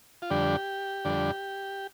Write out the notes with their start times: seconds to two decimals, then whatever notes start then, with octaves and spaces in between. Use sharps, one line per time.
0.22 F4
0.30 F2 D3 G3 D4 G4
1.05 F2 D3 G3 D4